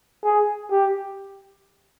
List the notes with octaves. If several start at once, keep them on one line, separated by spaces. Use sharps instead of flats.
G#4
G4